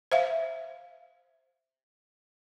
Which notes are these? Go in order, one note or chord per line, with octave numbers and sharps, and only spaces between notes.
C5 E5 F5